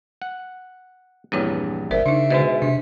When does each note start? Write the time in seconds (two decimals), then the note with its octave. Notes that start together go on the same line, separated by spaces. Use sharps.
0.22 F#5
1.32 A#1 E2 G2 C4 E4 C#5
1.91 G1 A#4 C5 D5 E5
2.06 C#3 D4 D#4
2.30 B2 D3 G#3 C5 D#5
2.62 C3 D4